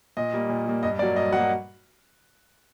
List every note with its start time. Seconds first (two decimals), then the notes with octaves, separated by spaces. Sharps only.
0.17 A#2 D#5
0.33 G3 A#3
0.49 A#2
0.66 G3 A#3
0.83 G2 D#5
0.99 A#3 D5
1.02 F#3
1.16 G2 D#5
1.32 F#3 F#5
1.36 A#3